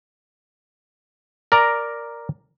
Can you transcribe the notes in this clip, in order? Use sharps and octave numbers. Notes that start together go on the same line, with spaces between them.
A#4 D5 A#5